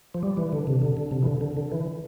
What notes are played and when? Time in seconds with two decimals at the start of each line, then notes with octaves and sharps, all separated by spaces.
0.14 F3
0.23 G3
0.37 E3
0.53 D3
0.67 C3
0.82 D3
0.97 D3
1.11 C3
1.23 E3
1.26 D3
1.41 D3
1.57 D3
1.72 E3